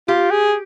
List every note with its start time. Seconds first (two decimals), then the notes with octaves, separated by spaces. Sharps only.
0.08 F4 G4
0.31 G#4